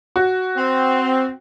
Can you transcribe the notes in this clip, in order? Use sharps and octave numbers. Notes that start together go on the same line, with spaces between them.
F#4
C4